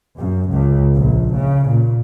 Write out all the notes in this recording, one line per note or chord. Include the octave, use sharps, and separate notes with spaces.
F#2
C#2
A#1
C#3
A#2